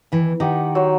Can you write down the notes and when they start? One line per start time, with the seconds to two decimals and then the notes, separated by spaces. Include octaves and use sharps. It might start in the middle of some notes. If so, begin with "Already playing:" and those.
0.12 D#2 E3
0.40 D#3 D#4 G4 F#5
0.75 F#3 C5